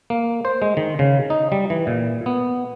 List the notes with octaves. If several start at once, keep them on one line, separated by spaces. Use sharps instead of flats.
A#3
C5
G#3
D#3
C#3
D#4
G3
E3
A#2
B3